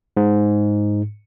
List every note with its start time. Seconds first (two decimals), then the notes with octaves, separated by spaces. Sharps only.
0.17 G#2